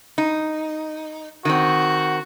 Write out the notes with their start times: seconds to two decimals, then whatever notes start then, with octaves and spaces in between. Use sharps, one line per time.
0.18 D#4
1.45 D#3 C4 F#4